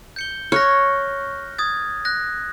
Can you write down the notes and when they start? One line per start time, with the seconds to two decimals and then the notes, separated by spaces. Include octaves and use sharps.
0.16 G6 C#7 G7
0.52 C#5 F6 F#6 A#6
1.58 D#6 G#6 A6
2.05 F#6 A#6